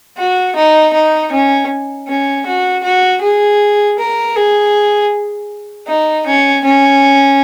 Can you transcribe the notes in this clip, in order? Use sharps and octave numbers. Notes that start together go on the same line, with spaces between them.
F#4
D#4
D#4
C#4
C#4
F#4
F#4
G#4
A#4
G#4
D#4
C#4
C#4